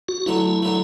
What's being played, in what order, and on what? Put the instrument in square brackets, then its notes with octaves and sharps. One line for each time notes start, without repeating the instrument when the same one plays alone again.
[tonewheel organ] F#4
[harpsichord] D3 F#3 A3 [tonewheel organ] E4
[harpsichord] D3 F#3 A3